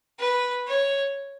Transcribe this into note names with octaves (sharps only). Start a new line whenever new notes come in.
B4
C#5